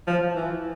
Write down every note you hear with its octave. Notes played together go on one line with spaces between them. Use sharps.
F3
E3